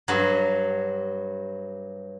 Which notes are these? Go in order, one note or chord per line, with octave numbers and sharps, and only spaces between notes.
G2 F#3